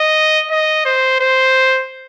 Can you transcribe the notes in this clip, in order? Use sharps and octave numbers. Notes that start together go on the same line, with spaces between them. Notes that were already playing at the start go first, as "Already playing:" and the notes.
Already playing: D#5
D#5
C5
C5